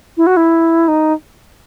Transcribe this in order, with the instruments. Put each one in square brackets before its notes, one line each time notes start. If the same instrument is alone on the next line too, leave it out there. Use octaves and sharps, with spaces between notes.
[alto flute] E4
F#4
E4
D#4